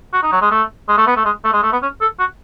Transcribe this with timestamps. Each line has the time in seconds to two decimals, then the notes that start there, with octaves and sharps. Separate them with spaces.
0.13 F#4
0.23 D#4
0.32 F#3
0.42 G#3
0.51 A3
0.88 G#3
0.97 A3
1.07 B3
1.17 A3
1.25 G#3
1.44 A3
1.53 G#3
1.63 A3
1.73 B3
1.82 C#4
2.01 A4
2.19 F#4